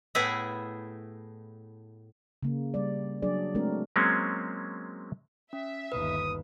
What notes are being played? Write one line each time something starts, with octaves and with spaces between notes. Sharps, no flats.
A2 A3 B3 E4 G#4 E5
C#3 A#3
G3 D5
F#3 D4 G#4 D5
G#3 A3 C4 D4 F#4 A#4
F#3 G#3 A#3 C4 C#4
C#4 E5
G1 D#2 B4 D#6